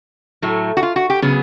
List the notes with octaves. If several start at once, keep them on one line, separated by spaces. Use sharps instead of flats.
A2 F#3 A3
F#4
F4
F#4
G4
C#3 F#3 B3 G#4